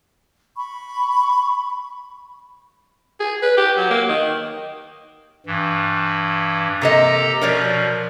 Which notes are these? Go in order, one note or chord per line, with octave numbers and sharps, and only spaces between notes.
B5 C#6
G#4
B4
G4
F#3
A#3
D#3
G2 E3
C3 A#3 G4 A4 D#5 A#5
B2 F3 A#4 C#5 D5